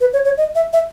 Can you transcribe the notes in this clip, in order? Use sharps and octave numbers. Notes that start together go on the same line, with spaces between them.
B4
C#5
C#5
D#5
E5
E5